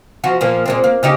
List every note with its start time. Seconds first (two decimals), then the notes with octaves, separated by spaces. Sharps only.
0.24 F3 F#4
0.41 A#2 F3 A#3
0.66 A#2 G#3 C4
0.84 A#3
1.03 C#3 D#4 G4